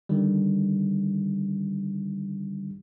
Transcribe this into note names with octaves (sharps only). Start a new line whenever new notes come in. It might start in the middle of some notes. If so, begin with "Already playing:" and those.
D3 D#3 G3